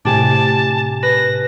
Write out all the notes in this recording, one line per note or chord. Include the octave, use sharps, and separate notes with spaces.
A2 C3 D4 G4 G#5 A5
B4 A#6